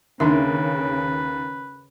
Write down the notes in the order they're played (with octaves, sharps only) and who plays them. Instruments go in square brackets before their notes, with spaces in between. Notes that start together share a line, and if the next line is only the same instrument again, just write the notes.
[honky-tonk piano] D#2 [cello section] C#3 [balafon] D4 D#4 E5 [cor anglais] B4